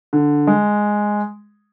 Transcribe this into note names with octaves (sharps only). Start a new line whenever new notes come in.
D3
G#3